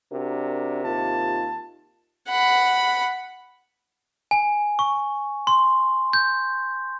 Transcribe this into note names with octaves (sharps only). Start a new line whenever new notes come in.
C3 D4 F#4 A#4
D#2 D#3 F4 A5
F#5 B5
G#5
C#6
C6
G6